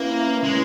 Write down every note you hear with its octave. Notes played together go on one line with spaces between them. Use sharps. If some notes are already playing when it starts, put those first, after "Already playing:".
Already playing: A#3 C#4 E4 B4
G#3 C#4 E4 B4